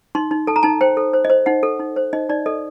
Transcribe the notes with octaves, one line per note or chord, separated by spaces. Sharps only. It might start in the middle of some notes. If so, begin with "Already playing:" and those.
D#4 C6
D#4
A4 A5
A#5
D#4 A5
C5 G5
A4
C5
D#5
C5
D#4 F#5
A4
D#4
C5
D#4 D#5
D#4 D5
A4 D#5